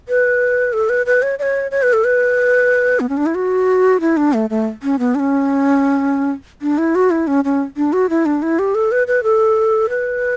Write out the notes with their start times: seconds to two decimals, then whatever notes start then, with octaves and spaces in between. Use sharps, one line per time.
0.09 B4
0.73 A4
0.89 B4
1.06 B4
1.22 C#5
1.39 D5
1.43 C#5
1.71 C#5
1.83 B4
1.93 A4
2.04 B4
3.00 B3
3.09 C#4
3.17 D4
3.26 E4
3.35 F#4
4.01 E4
4.17 D4
4.33 A3
4.50 A3
4.83 C#4
4.99 B3
5.15 D4
5.20 C#4
6.62 D4
6.78 E4
6.95 F#4
7.11 E4
7.27 C#4
7.44 C#4
7.77 D4
7.93 F#4
8.10 E4
8.26 D4
8.42 E4
8.59 G4
8.75 A4
8.92 B4
9.07 B4
9.23 A4
9.89 B4